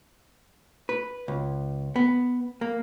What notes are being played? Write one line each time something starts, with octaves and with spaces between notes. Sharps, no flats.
B4
C#2
B3
A#3